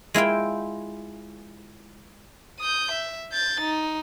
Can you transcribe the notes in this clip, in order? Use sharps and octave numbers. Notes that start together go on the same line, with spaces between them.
G#3 E4 F4 G5
D#6 G6
E5
G6 A6
D#4